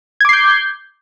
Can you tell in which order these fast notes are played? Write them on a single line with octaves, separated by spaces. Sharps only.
G#6 D6 C7 G6